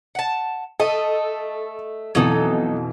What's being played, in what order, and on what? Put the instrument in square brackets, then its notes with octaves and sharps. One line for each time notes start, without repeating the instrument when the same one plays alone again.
[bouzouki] F#5 A5
[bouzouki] A3 D#5 [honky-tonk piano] A4
[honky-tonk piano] F2 B2 E3 [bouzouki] F#3 D#4 A4